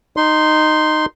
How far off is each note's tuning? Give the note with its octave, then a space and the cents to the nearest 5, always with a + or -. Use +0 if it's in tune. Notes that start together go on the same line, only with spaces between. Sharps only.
D#4 -10 C6 +0